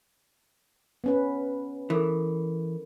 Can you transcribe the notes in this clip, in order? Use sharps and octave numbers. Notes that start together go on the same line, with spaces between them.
B3 C#4 B4
E3 A4 A#4